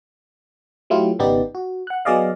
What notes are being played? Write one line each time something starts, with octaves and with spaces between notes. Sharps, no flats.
F#3 A3 E4 F4 G4
G#1 C#3 B3 D#4 G4 D5
F#4
F#5 F#6
F#3 B3 G#4 D5 D#5 F5